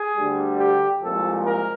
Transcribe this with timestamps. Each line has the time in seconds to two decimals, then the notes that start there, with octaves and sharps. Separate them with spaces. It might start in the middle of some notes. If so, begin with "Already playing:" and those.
Already playing: G#4
0.17 D2 D3 G3
0.59 G4
1.01 C2 A#2 F3 G#3 A4
1.44 A#4